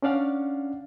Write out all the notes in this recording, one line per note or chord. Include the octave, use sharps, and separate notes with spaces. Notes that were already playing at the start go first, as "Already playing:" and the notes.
C#4 D4 D5 F5 F#5